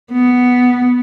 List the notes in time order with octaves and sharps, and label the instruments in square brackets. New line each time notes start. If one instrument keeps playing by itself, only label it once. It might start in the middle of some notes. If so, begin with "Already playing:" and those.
[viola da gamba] B3